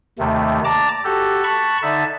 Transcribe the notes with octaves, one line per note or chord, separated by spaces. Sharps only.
D#2 C3 D#3 A3
D5 A5 A#5 D6
F#4 G4 A4
A5 B5 C#6 F#6
D3 D#4 E5 A5